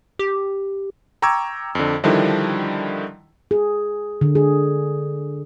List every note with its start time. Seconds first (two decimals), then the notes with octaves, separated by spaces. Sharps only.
0.19 G4
1.22 G5 A#5 C#6 D6 E6 G#6
1.75 F2 D3
2.04 D3 D#3 F3 G3 D4 E4
3.51 G#4
4.21 D3
4.35 G#4